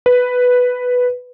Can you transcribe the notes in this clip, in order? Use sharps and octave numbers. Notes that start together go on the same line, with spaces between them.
B4